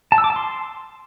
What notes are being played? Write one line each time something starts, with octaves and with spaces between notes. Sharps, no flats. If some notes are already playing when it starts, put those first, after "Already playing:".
A5
E6
D6
A5
C6